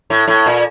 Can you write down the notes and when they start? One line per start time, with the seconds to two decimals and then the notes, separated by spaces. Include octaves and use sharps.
0.10 A2
0.28 A2
0.46 A#2